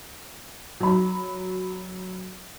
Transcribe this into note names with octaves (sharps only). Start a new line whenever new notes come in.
F#3 B5